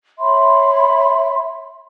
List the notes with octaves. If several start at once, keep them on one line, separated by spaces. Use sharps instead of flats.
C#5 E5 B5 C6